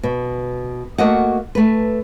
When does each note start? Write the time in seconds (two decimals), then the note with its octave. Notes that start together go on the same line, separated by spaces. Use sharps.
0.03 B2
0.98 A3 A#3 F#4 D#5 F#5
1.55 A3 B4